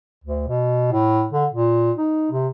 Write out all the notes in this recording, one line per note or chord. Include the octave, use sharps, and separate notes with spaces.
D2
B2
A2
D3
A#2
D#4
C3